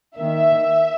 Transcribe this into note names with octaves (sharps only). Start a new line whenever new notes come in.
D#3 A#3 E5